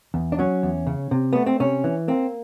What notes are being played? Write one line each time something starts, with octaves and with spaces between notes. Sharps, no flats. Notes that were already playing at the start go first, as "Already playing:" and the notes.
E2
D4
F#3 C#4
E2
C#3
C3
A3 B3
C4
C3 C#4
E3
A#3 C4